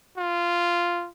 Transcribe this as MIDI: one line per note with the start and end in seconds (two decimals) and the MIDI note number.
0.18 1.08 65